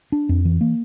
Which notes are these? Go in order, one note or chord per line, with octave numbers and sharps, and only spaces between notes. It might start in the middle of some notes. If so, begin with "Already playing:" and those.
D4
F2
E3
A#3